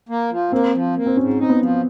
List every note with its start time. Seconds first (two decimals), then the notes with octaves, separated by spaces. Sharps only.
0.09 A#3
0.30 F3
0.51 A#3 C4
0.74 F3
0.96 A#3
1.06 C4
1.17 G#2 C#4
1.39 C4 D#4
1.49 B3
1.60 F3